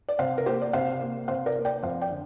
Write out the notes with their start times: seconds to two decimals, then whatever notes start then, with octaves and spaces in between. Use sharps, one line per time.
0.09 D5
0.19 C3 C5 F5
0.38 A#4
0.46 A#3 G4 C5
0.62 D5
0.73 C3 C5 F5
1.01 A#3
1.28 C3 C5 F5
1.46 A#4 D5
1.56 A#3
1.65 D5 G5
1.83 F2 C5 F5
2.01 D5 G5
2.11 D3